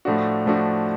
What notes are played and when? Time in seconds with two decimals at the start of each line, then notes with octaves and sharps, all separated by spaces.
0.05 A2 F3 A3 D4 F#4
0.46 A2 F3 A3 D4 F#4